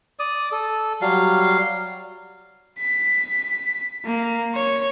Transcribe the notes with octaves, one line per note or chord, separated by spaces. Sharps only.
D5 D#6
A4
F#3 G3 F5
B6
A#3
C#5